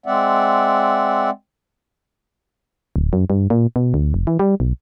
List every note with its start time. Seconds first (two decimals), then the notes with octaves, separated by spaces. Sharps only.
0.06 G#3 C4 D5 E5 F#5
2.96 D1
3.13 F#2
3.30 G2
3.50 A#2
3.76 B2
3.94 D2
4.14 F1
4.27 E3
4.39 G3
4.60 B1